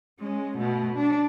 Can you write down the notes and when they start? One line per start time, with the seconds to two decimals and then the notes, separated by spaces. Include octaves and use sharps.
0.20 G#3 C#4
0.57 B2 A3
0.95 D4